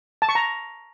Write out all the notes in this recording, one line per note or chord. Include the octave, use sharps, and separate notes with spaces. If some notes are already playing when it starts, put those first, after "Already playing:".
A5
C#6
A#5